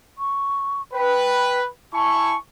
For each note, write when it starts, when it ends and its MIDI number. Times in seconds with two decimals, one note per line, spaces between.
0.18 0.82 85
0.94 1.68 71
0.94 1.60 79
1.94 2.37 64
1.94 2.37 80
1.94 2.36 81
1.94 2.37 85